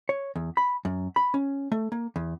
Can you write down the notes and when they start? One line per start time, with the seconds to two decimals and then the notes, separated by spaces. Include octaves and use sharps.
0.09 C#5
0.36 E2
0.57 B5
0.85 F#2
1.16 B5
1.34 C#4
1.72 A3
1.92 A#3
2.16 E2